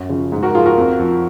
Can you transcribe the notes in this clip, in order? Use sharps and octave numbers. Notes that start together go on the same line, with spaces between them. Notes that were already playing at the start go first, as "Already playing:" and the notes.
Already playing: F#2 F#4
C#3 F3
G#2
F#4 A#4
F3 F4 G#4
F#4 A#4
F2
F3